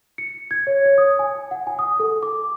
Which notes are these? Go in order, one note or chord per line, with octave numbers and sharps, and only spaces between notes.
C#7
G#6
C#5
C#5
D#6
G#5
F#5
G#5
D#6
A4
D6